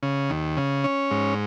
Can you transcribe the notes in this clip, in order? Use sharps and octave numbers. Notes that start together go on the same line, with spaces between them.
C#3
D#2
C#3
C#4
G#2